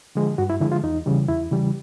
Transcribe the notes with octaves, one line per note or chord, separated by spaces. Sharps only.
D3 F3 G#3
G2 F#4
E4
D3 F3 G#3 E4
F4
E2 D#4
C#3 E3 G3
E2 E4
C#3 E3 G3